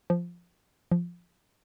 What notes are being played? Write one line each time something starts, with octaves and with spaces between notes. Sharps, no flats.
F3
F3